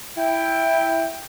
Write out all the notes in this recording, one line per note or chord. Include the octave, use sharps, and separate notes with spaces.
E4 G5